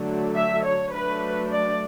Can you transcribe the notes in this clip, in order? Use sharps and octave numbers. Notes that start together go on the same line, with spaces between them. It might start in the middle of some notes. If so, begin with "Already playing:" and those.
Already playing: D3 F#3 A3 D4
E5
C#5
F#3 A3 D4 B4
D5